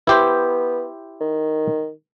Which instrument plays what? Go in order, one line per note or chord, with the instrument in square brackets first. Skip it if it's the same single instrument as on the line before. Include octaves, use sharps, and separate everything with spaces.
[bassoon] B3 [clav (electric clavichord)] E4 G4 C5
[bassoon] D#3